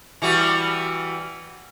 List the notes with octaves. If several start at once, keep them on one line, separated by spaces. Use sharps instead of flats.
E3 G3 F#4